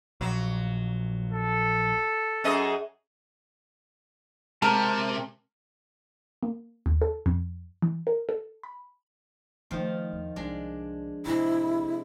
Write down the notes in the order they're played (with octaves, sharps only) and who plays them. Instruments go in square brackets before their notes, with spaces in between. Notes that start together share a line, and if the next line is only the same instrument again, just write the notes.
[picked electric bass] A#1 [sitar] F#3
[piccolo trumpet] A4
[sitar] F#2 G#4 D#5
[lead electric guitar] C3 [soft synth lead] G#3 [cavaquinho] A#4 [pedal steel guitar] A5
[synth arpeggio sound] A#3
D#2
A4
F2
E3
A#4
A4
B5
[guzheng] D#3 F3 F4 [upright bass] A3 C#4
[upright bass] E2
[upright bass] C2 D#4 [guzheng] G#3 D4
[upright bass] A1 [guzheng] C3 G#3 [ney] E4